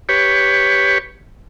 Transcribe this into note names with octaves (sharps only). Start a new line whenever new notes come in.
G4 B4 C#5